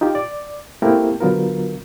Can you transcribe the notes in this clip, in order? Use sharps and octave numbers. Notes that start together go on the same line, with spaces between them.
D#4 F4 G4
D5
A3 A#3 C4 E4 G4 A#4
D3 F#3 B3 F4 A#4